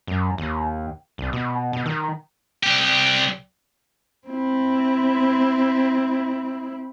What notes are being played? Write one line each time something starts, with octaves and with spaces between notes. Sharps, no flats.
F#2
D#2
C2
B2
B2
D#3
C2 G4
C4 E4